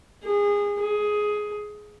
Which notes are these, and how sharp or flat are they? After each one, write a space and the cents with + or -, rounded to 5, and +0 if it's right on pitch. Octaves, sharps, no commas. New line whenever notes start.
G#4 -25
G#4 +10